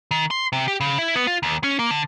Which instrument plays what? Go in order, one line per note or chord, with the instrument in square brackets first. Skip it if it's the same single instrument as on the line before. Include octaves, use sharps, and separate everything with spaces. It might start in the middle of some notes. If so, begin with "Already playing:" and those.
[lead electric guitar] D#3
C6
C3
G4
C#3
E4
B3
F4
D#2
C#4
A#3
D3